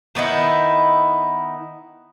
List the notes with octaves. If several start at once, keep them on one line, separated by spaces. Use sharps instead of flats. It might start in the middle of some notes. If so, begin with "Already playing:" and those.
D#3 B3 D#4 E4